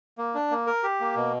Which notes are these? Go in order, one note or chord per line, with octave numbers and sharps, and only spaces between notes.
A#3
D4
A#3
A#4
G4
A#3
B2